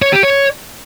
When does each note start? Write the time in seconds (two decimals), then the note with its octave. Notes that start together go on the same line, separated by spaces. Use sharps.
0.02 C#5
0.13 G4
0.23 C#5